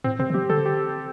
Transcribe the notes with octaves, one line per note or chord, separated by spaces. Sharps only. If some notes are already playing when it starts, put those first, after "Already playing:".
A2 C4
C3 C4
D3
F3 G4
D3 A4
G4